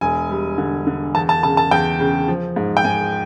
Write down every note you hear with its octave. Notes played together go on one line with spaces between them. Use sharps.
E1 G#5
G3
D3
D3
E2 A5
A5
C#3 A5
A5
E2 G5
C#3
F3
G#2
G5
G#2 G#5